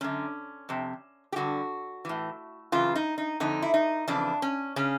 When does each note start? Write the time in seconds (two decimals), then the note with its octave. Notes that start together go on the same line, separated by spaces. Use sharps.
0.01 F#2 D3 C#4
0.69 F2 C3
1.32 G4
1.36 G2 D3 F#4
2.05 A2 E3
2.72 F#2 C#3 E3 F4
2.95 D#4
3.18 D#4
3.40 F2 D3 D#4
3.62 E4
3.74 D#4
4.07 F2 C#3 E3 D4
4.42 C#4
4.76 C#3 C#4